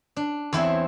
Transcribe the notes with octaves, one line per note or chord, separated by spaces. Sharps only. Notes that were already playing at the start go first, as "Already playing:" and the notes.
D4
E2 C4 E4 C5 C#5